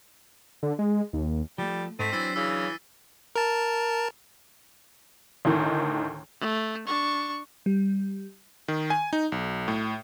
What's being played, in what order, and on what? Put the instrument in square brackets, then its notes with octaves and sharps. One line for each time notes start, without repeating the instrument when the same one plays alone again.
[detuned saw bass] D3
G#3
D#2
[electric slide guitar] F3 A3 [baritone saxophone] G3
[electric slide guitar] G#2 [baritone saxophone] A3 [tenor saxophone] C4 [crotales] B6 D#7
[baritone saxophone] E3 [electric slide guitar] F#3 D4 [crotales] E6 A6 C7
[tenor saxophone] C#3 [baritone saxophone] E3 [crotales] E6
[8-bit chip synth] A#4 A5
[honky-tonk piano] D2 A2 D#3
[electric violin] A3
D4 C#6
[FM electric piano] G3
[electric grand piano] D#3
G#5
D#4
B1
A2